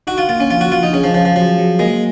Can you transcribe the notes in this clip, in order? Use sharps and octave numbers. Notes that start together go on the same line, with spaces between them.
D#4 F#4
F4
A#3 F4
C#4
F3 F4
F#4
F3 F4
D#4
C#4 G#4
F3
F3 C#4
F3
F3 F#3
F#3
G#3 A#3